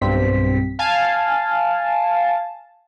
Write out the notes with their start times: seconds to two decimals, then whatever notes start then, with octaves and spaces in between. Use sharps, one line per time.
0.01 B1 G2 C4 B6
0.79 F5 G#5 A5